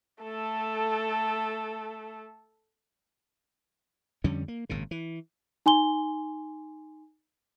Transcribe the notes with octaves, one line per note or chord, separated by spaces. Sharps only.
A3 A4
F2 D3 G3 C#4
A#3
G#1 A#2 C#3
E3
D#4 G#5 C6 G7